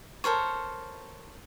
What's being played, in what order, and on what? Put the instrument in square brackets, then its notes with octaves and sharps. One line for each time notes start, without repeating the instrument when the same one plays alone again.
[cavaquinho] A4 A#4 C5 C#5